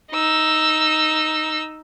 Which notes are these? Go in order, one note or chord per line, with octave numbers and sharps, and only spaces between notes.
D#4 E6